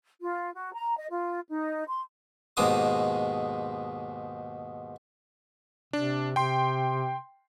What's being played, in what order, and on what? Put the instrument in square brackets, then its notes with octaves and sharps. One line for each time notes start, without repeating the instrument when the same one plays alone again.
[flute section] F4
F#4
A#5
D#5
F4
D#4
C6
[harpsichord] D#2 G#2 B2 G#3 D6 D#6
[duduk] C3 [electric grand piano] D4
[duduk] C3 [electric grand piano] G5 C6